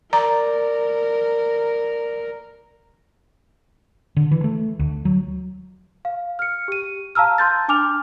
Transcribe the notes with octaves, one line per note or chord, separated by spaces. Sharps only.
A#4 D5 A#5
D3
E3
A3
D2
F#3
F5
F6 C#7
G4 D#7
F5 A5 A#5 E6 F6
A5 C6 G6 A6
D4 G#5 D6 F6 F7